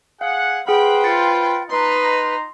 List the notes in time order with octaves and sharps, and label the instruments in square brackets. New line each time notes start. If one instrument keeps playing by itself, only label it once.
[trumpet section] G#4 F#5 [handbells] F5
[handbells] G#4 F#5 F6 [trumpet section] B4 C5 [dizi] G5 [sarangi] B5
[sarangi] F4 [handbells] A6 C#7
[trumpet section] D#4 A#5 [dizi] B4 [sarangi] C6